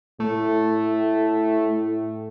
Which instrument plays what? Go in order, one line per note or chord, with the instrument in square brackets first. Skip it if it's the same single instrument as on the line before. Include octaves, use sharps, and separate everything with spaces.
[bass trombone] A2 [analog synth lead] A3